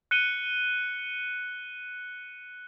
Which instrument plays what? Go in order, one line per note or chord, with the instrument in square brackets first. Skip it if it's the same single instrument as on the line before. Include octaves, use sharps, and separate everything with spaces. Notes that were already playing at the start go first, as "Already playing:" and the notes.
[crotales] F#6 C#7 D#7 G7